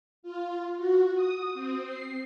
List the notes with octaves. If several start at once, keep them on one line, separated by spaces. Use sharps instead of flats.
F4
F#4
D#6
C4
C7